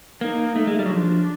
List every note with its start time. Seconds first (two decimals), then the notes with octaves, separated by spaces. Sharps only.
0.21 A#3 D#4
0.56 A3
0.67 G#3
0.79 G3
0.86 F#3
0.90 F3 D4